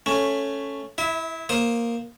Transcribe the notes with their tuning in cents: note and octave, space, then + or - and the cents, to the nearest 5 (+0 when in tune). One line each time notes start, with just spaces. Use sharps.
A3 +0 C#4 +0
E4 +0 E5 -30
A#3 +0 C5 +10 D#6 +0